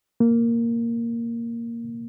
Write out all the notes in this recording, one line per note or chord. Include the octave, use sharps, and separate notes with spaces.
A#3